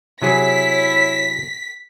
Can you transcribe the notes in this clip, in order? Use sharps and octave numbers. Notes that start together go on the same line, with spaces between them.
C3 F#3 E4 G#4 C#5 B6